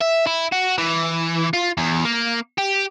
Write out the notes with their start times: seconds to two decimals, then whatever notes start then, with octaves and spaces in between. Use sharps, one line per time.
0.01 E5
0.27 E4
0.52 F#4
0.78 E3
1.53 F4
1.77 E2
2.05 A#3
2.58 G4